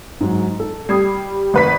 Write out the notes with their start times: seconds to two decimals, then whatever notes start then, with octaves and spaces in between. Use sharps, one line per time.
0.20 G#2 F#3
0.60 A4
0.89 G3 D#6 G#6 C7
1.54 G#1 B4 B6